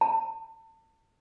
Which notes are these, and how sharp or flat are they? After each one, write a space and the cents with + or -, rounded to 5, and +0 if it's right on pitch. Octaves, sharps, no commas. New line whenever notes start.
A5 +35